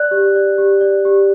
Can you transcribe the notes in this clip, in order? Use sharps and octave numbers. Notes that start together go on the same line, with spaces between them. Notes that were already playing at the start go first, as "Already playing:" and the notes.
Already playing: D5 F#6
G4
D5
G4
D5
G4